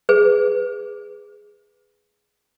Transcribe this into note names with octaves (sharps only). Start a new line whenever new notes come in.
G#4 B4